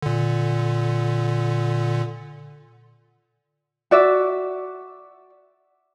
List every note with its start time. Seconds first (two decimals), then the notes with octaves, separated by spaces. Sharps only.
0.02 A#2 D3
3.91 F#4 D5 E5